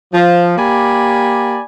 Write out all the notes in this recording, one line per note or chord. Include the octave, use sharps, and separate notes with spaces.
F3
A#3 G4 D5 G#5 B5